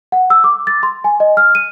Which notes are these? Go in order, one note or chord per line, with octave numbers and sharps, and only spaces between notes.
F#5
E6
D6
A6
C6
G#5
D#5
F6
D#7